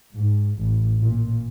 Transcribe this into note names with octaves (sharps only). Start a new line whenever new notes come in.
G#2
A1
A#2